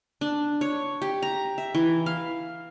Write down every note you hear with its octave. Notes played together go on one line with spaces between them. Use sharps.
D4
C#5
G4
A#5
E5
E3
F5